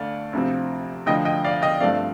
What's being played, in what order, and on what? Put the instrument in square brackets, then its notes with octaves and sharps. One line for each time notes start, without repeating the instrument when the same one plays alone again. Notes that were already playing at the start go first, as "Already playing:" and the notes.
Already playing: [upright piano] D2 D3 A3 D5 F5
D2 C3 F3 C4
D2 D3 F3 D#5 G5
D#5 G5
D5 F5
D#5 G5
G2 F3 A3 C4 D5 F5